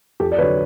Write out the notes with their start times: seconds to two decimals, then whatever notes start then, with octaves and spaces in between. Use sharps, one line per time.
0.20 F2 G4 A4
0.32 D5
0.38 D3 F#3 B4 C#5